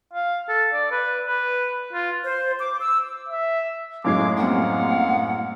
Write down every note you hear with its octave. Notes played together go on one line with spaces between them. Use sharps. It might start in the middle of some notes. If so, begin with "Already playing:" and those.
F5
A4
D5
B4
B4
F4
C5
D6
E6
E5
F#2 A2 G#3 F5 D6 G#6 C7
G3 A#3 C4 F5 F#5